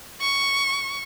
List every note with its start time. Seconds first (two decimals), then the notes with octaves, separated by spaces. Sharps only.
0.21 C#6